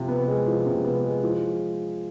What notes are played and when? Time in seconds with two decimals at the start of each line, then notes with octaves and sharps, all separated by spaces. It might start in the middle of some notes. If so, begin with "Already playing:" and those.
Already playing: C3 F3
0.08 B3
0.28 G#3
0.47 F3
0.66 C3
0.84 B3
1.05 G#3
1.24 F3